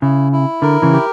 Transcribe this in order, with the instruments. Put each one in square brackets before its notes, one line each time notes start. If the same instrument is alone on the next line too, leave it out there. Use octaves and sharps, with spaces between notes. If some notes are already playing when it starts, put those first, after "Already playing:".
[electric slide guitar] C#3 [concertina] E4
[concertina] E4
[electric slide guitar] D3 [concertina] A#4
[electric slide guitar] C#3 E3
[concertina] G4